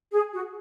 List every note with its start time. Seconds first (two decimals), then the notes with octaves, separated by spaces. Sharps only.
0.12 G#4
0.33 F#4